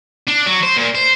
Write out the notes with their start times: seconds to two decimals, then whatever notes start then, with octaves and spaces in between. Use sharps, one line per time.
0.28 D4
0.47 F#3
0.63 C5
0.77 A#2
0.95 C5